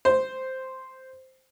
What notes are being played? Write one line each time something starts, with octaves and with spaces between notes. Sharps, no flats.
C5